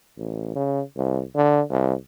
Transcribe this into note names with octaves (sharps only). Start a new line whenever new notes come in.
A1
C#3
C2
D3
C2